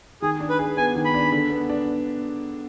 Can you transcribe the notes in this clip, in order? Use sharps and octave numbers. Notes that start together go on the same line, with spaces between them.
D#3 G#4
D4
B4
G#4
B3 G#5
D#3
B5
D4
D3
B3
D4